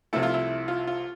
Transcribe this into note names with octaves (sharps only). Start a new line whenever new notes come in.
C2 C3 F3 A3 E4
F4
E4
F4
F4